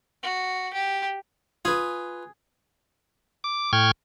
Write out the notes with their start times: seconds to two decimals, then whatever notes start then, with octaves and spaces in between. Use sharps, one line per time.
0.23 F#4
0.73 G4
1.65 F4 G#4 B4
3.44 D6
3.73 A2 G5 C#6 F6 G#6